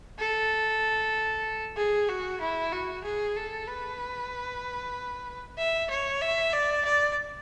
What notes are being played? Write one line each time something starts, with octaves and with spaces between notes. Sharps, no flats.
A4
G#4
F#4
E4
F#4
G#4
A4
B4
E5
C#5
E5
D5
D5